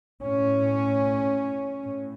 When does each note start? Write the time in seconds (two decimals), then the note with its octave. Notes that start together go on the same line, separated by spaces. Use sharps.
0.22 A2 C#4
1.85 A2